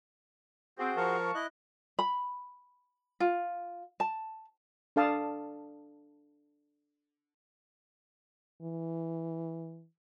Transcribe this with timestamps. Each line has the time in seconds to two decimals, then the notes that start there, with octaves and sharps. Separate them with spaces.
0.79 C4 F#4 G#4 C5
0.97 F3 A#4 F5 A5 C#6
1.35 E4 D#5 F#6
1.99 B5
3.20 F4
4.00 A5
4.96 D4 A4 F5 A5 D6 D#6
8.62 E3